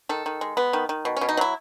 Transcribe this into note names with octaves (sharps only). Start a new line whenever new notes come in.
D#3 A4
D#3
G#3
B3
D#3
D#3
B2
B2 C#4
D#4
F#3 E4